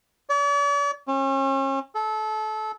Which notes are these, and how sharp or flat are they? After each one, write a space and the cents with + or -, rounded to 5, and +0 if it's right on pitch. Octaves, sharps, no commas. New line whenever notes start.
D5 -45
C#4 -40
A4 -25